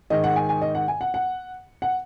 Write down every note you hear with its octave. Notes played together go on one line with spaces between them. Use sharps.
G#2 D#3 D#5
F#5
G#5
G#5
D#5
F#5
G#5
F#5
F#5
F#5